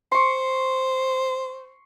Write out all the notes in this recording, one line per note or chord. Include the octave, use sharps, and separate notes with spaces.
C5 C6 C#6